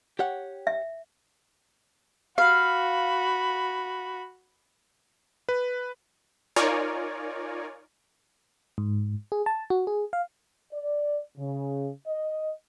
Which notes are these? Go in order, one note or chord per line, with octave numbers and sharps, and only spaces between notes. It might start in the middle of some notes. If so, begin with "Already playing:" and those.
G4 C#5 F#5
E5
F#4 F5 B5
B4
D#4 F4 A#4 C#5 D5 G#5
G#2
G#4
A5
F#4
G#4
F5
D5
C#3
D#5